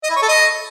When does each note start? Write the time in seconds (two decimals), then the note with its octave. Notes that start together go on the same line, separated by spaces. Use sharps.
0.03 D#5
0.10 E4
0.16 C#5
0.22 A4
0.29 D#5